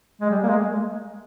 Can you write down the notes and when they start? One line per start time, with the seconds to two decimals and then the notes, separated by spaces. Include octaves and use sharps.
0.21 G#3
0.31 G3
0.43 A#3
0.49 G#3